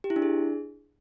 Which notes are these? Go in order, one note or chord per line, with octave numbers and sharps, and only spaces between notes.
G4
E4
D4
G#4